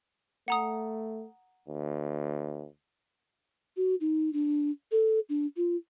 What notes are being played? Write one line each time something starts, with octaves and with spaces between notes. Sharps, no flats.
A3 F#5 A#5 D#6
D2
F#4
D#4
D4
A4
D4
F4